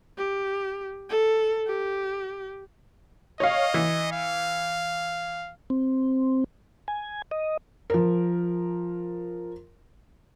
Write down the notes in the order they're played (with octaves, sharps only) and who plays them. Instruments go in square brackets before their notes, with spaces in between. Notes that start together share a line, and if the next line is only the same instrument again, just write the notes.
[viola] G4
A4
G4
[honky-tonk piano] C#5 F5 [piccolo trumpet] D#5
[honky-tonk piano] E3
[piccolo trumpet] F5
[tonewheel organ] C4
G#5
D#5
[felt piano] F3 A#4